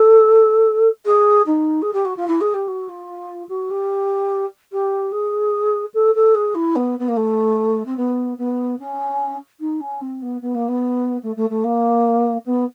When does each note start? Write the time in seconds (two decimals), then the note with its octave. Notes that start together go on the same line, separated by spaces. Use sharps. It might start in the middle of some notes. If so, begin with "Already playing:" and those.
Already playing: A4
1.05 G#4
1.46 D#4
1.82 G#4
1.93 G4
2.05 F#4
2.16 F4
2.27 E4
2.41 G#4
2.54 G4
2.68 F#4
2.88 F4
3.49 F#4
3.70 G4
4.72 G4
5.12 G#4
5.94 A4
6.15 A4
6.34 G#4
6.55 E4
6.75 B3
6.99 B3
7.08 A#3
7.16 A3
7.85 C4
7.97 B3
8.38 B3
8.79 C#4
9.60 D#4
9.80 C#4
10.01 C4
10.22 B3
10.41 B3
10.54 A#3
10.68 B3
11.23 A3
11.36 A3
11.50 A3
11.64 A#3
12.46 B3